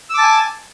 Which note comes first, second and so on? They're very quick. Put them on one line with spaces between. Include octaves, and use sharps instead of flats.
E6 D6 A5 G#5